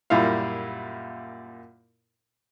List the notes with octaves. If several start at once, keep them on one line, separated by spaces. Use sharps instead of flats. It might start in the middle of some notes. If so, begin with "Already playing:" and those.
F#2 A#2 G3 E4 F5